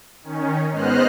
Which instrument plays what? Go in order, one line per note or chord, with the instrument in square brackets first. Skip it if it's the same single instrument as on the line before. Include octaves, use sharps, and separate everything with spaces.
[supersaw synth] D#3 C#4
G#2 B3 C5 D#5 F6 F#6